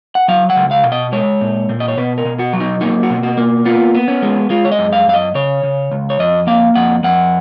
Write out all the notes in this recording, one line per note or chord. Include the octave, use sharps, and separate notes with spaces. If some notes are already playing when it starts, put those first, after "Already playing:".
F#5
F#3 F5
F#5
C#2
F5
B2
D#5
G#3 C#5
A#2
A#2
D#5
C#5
B2 B4
A#4
B2
F#4
F#3
D#4
A#3 D#4
F#4
B2
F#4
A#3
B3 F4
B3
C#4
G#3
G#3 F4
C#5
D#5
F#2
F5
F#2 F5
D#5
C#3 C#5
C#3
C#2
C#5
F2 D#5
A#3 F5
F2 F#5
F2 F#5